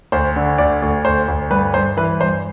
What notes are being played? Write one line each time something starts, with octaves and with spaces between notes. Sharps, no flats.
D2 C5
D3
D2 D5
D2
D2 C5
D2
G2 B4
G2 C5
E3 B4
G2 C5